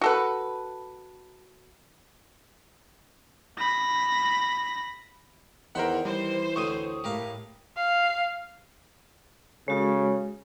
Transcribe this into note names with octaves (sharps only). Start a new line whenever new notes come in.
F#4 A4 B4
B5 A#6
E2 D#3 A#4 C5 F#5 B5 C6
E3 G3 C5
D2 A2 G#5 C#6 D#6 D#7
A2 G4 A#4 F5
F5
C#3 G#3 F#4 A4 C#5